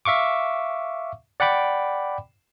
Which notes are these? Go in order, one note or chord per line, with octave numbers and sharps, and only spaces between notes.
E5 F5 C#6 D6
D5 F#5 G5 B5 D6